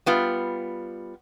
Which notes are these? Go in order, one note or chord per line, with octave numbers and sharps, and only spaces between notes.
G3 B3 F4